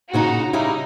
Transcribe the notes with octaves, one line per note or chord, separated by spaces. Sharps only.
A#2 C#3 D#4 F#4 A#5
C#3 G3 D#4 E4